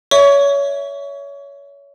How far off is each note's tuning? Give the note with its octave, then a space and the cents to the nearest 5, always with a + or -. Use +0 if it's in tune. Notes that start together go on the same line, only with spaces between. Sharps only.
C#5 +25 E5 +0 C#6 +25